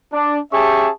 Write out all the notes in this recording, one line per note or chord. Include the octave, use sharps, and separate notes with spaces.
D4
C#4 G4 G#4 E5 A5 C#6